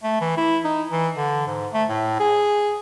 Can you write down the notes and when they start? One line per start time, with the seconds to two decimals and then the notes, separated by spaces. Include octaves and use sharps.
0.03 A3
0.21 E3
0.37 E4
0.64 D#4
0.91 E3
1.17 D3
1.47 G#2
1.73 A3
1.89 A2
2.20 G#4